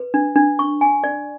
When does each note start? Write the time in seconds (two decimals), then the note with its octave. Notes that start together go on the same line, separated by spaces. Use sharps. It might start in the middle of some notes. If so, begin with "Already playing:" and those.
Already playing: B4
0.14 D4
0.36 D4
0.59 C#6
0.81 G#5
1.04 D5